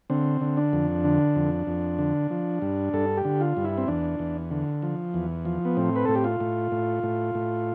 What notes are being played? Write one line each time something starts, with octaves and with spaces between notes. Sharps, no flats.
D3 C4
D3
D4
F2
D3
F2
F2
D3
F3
G2
G2 A4
G4
D3
F4
G2
E4
C4
E2 D4
E2
D3
F3
E2
F3
B3
A2 C4
B4
A2 A4
G4
F4
A2
A2
A2
A2